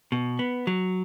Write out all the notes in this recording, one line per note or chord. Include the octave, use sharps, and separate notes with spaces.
B2
B3
F#3